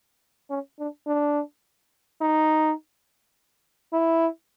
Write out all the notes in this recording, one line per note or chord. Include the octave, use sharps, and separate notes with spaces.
C#4
D4
D4
D#4
E4